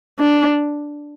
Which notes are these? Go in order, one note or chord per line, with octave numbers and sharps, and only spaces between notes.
D4